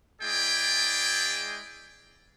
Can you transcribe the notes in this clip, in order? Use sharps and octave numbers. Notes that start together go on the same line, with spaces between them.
G#3 E4 G#4 D5 G5